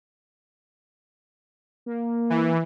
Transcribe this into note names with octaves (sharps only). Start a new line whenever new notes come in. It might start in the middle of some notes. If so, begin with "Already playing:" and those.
A#3
E3